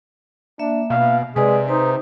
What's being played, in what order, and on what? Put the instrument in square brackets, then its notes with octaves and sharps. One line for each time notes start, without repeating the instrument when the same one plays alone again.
[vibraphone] A#3 E5 [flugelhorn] D4
[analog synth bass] B2 [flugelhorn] F5
[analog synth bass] C3 [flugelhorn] G#3 [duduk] G#4 [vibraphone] B4 D5
[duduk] D#4 [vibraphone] B4 [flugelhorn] C5